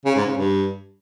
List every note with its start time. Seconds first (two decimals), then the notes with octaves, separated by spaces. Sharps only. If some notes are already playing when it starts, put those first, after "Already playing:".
0.05 C#3
0.16 G#2
0.27 C#3
0.37 G2